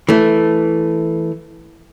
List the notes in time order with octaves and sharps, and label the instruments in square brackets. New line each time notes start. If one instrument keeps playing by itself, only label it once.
[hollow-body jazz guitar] E3 A3